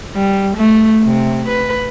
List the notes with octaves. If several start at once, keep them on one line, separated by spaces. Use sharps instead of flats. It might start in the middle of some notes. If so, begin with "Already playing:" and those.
G3
A3
C3
B4